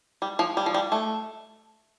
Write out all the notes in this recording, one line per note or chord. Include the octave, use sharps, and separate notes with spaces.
G3
F3
G3
F3
G3
A3